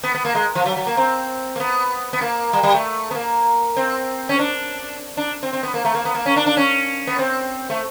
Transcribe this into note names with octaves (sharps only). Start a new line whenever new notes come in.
B3
B3
A#3
G#3
F3
F#3
F#3
A#3
C4
A#3
B3
B3
A#3
G3
G3
A3
B3
A#3
C4
C#4
D4
D4
C4
C4
B3
A#3
A3
A#3
B3
A#3
C#4
D4
D4
C#4
B3
C4
A3